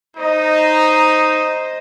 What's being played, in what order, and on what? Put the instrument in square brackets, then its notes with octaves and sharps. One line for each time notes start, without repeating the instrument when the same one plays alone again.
[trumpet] D#4 [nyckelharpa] C5 D#5